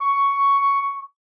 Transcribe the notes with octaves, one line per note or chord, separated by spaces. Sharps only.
C#6